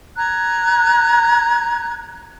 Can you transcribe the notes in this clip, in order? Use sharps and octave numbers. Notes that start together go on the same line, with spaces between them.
A#5 F#6 G#6